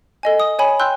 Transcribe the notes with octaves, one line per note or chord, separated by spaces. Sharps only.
A4 D#5 G#5
D#6
C#5 G#5 B5
G5 C6 E6 F#6 G6